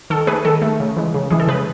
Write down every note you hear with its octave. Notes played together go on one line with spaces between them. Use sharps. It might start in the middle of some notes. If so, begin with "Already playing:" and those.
D#3 A4
A3 G#4 B4
D#3 A4
A3
C#3
E3 G#3
C#3
E3 G#3 G#4
A4
C#3 G#4 B4